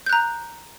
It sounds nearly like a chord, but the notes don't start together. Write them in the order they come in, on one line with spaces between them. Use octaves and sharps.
G6 F#6 A#5